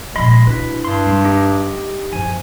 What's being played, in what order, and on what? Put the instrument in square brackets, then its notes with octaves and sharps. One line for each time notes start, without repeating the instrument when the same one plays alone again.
[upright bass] A#2 F3 [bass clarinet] G#3 [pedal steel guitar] D#5 B5 C6
[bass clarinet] B2 [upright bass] D4 E4 [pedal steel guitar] B4
[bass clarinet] G2 [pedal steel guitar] C6
[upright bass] G3 D4
[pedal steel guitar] D#4 G4
[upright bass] F#2 [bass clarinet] F3 [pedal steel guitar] G#5